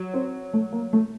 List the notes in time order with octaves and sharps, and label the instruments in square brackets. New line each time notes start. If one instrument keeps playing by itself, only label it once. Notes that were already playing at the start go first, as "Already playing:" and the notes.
Already playing: [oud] F#3
[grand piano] C4
A3
A#3
A3